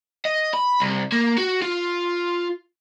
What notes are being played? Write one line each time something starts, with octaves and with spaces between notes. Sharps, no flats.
D#5
B5
C2
A#3
F#4
F4